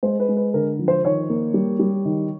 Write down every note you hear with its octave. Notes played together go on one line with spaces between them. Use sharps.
G#3 C5
B4
G#3
B4
D3 A#4
F3
C5
D#3 C#5
A#3
G3
G3
D#3